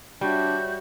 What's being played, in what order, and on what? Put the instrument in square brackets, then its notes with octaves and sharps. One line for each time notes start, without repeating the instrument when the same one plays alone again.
[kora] G3 [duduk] D4 [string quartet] F#4 C#5 E5 [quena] G6